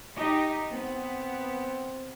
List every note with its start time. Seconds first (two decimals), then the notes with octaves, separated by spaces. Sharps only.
0.16 D#4 G4 D#5
0.72 B3 C4